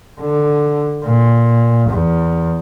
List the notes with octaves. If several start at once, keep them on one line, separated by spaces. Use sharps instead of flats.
D3
A#2
E2